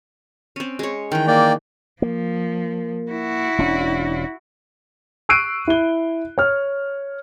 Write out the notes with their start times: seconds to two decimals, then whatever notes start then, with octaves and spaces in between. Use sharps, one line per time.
0.56 C4 C#4
0.79 G#3 C#5
1.12 D#3 E3 G5
1.27 A#3 D5 G5
2.02 F3 A#3
3.11 E4 F#4
3.58 E1 C#4 D4
5.29 C#6 E6 F#6 C7 D7 D#7
5.67 E4 G7
6.38 C#5 F6